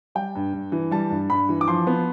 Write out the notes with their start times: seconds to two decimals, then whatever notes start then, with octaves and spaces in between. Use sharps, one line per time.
0.15 G3 G5
0.35 G2
0.53 G2
0.72 E3
0.91 G3 A5
1.10 G2
1.30 G2 B5
1.49 E3
1.61 D6
1.67 F3 C6
1.87 B3